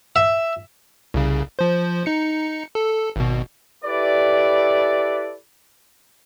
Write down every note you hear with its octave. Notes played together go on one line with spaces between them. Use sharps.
E5
C2 C#3
F3 C5
D#4 C#7
A4
G#1 B2
E4 G4 A4 B4 D5